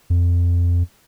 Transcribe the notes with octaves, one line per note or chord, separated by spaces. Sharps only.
F2